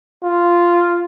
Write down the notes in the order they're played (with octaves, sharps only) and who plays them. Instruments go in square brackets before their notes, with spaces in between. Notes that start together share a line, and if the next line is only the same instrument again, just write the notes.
[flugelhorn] F4